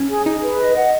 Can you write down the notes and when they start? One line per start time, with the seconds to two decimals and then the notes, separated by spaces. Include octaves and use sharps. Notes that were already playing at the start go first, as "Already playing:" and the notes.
Already playing: C#4
0.09 G#4
0.26 D#4 G#4
0.42 B4
0.60 D#5
0.76 F#5